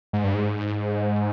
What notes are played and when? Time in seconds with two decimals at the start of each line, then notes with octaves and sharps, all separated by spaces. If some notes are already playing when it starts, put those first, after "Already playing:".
0.13 G#2
0.24 G2
0.34 G#2